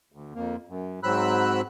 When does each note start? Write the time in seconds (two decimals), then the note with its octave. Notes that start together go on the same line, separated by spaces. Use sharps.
0.12 D2
0.34 F2 A#3
0.68 F#2
1.03 G#2 F#3 C4 B5 E6 F#6